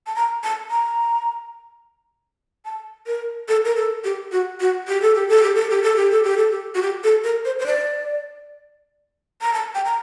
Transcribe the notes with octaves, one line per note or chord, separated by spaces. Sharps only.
A5
A#5
A5
A#5
A5
A#4
A4
A#4
A4
G4
F#4
F#4
G4
A4
G4
A4
G4
A4
G4
A4
G4
A4
G4
A4
G4
F#4
G4
A4
A#4
C5
C5
D5
A#5
A5
G5
A#5